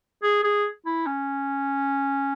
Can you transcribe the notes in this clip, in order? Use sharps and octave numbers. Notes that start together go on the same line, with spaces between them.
G#4
G#4
E4
C#4